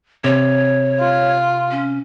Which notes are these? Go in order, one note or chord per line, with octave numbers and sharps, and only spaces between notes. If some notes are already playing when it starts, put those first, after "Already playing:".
C3 C#5
F4
C#4